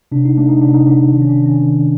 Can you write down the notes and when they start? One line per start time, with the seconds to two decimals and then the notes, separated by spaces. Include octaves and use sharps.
0.12 C3 D4
0.25 D#4
0.38 A3 D4
0.49 D#4
0.62 C3 D4
0.74 D#4
0.86 C3 D4
1.12 D#3 D4
1.22 C#4
1.29 D4
1.37 D#3
1.46 C#4
1.62 D#3